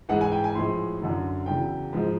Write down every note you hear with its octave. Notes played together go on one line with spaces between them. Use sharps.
G#2 E3 G#3 F#5
G#5
G5
G#5
A2 F3 G#3 C6
F#2 D3 F#3
E2 C#3 F#3 G5
G#2 F3 G#3